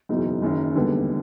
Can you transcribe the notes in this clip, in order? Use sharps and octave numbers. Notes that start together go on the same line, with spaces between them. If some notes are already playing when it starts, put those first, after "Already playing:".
F#1 E2 B2 D#4
F#1 F#2 D#3
E1 D#2 D3 G3 B3